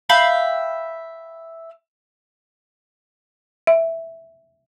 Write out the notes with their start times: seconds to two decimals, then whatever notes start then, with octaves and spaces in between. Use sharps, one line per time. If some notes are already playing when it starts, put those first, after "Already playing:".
0.09 E5 F5 G5 B5
3.67 E5